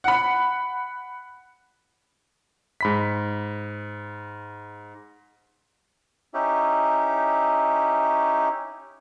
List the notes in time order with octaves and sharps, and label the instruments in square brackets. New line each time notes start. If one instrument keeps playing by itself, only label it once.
[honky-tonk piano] F#5 B5
[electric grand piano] G#2 B5 B6
[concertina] C#4 D#4 E4 G4